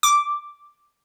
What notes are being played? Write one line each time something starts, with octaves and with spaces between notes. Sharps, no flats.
D6